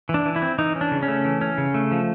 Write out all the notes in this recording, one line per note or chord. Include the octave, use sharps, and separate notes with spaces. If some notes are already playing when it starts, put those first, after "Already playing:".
E3
D4
E3
E4
C4
E3 D#4
C#4
D4
C#3
C#4
A3
E3
C#4
C#3
A3
F3